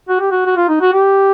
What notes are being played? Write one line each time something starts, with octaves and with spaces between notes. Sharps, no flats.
F#4
G4
F#4
F#4
F4
D#4
F#4
G4